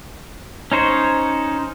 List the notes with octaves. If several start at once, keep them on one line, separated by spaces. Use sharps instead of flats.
C#4 D#4 C5 C#5